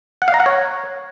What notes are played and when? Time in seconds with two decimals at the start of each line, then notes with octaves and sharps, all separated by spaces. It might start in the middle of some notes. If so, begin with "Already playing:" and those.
0.22 F#5
0.28 F5
0.34 A#5
0.40 F#5
0.46 C#5